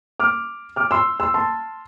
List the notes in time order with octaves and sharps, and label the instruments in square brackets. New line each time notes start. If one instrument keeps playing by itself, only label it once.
[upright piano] D6 F6
D6 F6
C6 E6
C6 E6
A5 C6